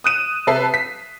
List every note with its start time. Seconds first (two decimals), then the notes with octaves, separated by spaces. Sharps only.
0.04 D#6 F#6 D#7 E7
0.47 C3 A4 B4 E5 C7
0.74 B6